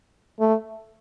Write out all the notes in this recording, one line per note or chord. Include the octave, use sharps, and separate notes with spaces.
A3